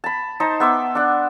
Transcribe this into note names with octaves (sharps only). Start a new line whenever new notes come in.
A5 B5
D#4 C5 A5
B3 E5 C6 D6
D4 F#5